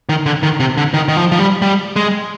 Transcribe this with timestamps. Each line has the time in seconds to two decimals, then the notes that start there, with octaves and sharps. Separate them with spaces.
0.09 D#3
0.26 D3
0.43 D#3
0.60 C3
0.78 D3
0.94 D#3
1.08 D#3
1.17 F3
1.32 F3
1.39 G3
1.62 G3
1.96 G#3